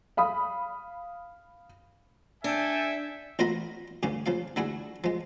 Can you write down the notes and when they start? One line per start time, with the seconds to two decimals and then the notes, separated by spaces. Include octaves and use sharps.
0.17 F5 B5 D#6
2.44 D4 A4 E5 G5 G#5
3.39 A1 F4 F#4 A#4 D#5 B5
4.03 D2 G2 C#3 C#4
4.26 C#3 F3 F5
4.56 D3 A3 E4 F#4 G#4
5.04 F3 G#3